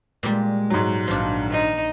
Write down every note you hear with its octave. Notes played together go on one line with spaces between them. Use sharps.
A#2 G3 G#3
G#2 F#3
A#1 D#3 F3 D4
D#4